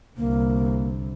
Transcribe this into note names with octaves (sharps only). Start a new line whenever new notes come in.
C2 D3 A#3